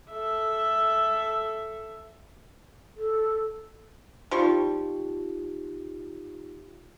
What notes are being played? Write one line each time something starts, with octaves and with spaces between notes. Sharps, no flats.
A4 E5
A4
F3 G3 D#4 F4 G4 C#6